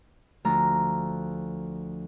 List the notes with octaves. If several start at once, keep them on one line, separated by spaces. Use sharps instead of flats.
D2 F3 A#5